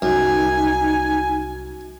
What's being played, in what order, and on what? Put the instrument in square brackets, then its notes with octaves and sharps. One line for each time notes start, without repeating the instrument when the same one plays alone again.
[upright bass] C2 [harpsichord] F#2 [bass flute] D#4 [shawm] G#5